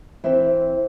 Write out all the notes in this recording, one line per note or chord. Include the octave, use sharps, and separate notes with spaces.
E3 C4 E5 G5